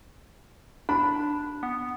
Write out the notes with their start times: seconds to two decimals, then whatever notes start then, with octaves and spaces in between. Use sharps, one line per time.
0.89 D4 B5
1.63 B3